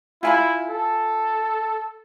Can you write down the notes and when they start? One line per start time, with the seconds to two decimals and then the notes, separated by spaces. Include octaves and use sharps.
0.23 E4 F4 G#5 B5
0.69 A4